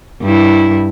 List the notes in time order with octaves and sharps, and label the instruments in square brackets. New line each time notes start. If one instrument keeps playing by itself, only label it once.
[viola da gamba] G2 E4